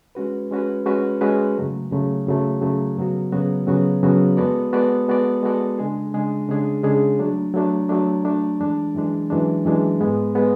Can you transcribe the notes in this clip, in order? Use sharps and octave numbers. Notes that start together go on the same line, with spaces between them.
G#3 C#4 F#4 B4
G#3 C#4 F#4 B4
G#3 C#4 F#4 B4
G#3 C#4 F#4 B4
F#2 C#3 F#3 A3
F#2 C#3 F#3 A3
F#2 C#3 F#3 A3
F#2 C#3 F#3 A3
F#2 C#3 F#3 B3 F#4
F#2 C#3 F#3 B3 F#4
F#2 C#3 F#3 B3 F#4
F#2 C#3 F#3 B3 F#4
G#3 B3 F#4 A4 D5
G#3 B3 F#4 A4 D5
G#3 B3 F#4 A4 D5
G#3 B3 F#4 A4 D5
C#3 G#3 D4 G#4
C#3 G#3 D4 G#4
C#3 G#3 D4 G#4
C#3 G#3 D4 G#4
F#3 A3 D4
F#3 A3 D4
F#3 A3 D4
F#3 A3 D4
F#2 E3 G#3 D4
F#2 E3 G#3 D4
F#2 E3 G#3 D4
F#2 E3 G#3 D4
G#2 G#3 B3
G#3 B3